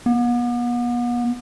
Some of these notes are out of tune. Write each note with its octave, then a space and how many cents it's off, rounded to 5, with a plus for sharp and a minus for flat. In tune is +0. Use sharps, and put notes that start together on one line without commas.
B3 -40